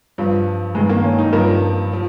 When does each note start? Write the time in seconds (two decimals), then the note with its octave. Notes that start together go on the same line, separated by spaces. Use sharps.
0.18 G2 F3
0.75 G2 G#3
0.79 D#3
0.89 A#3
1.04 C#4
1.18 D#4
1.33 G2 F3 A#4
1.93 F3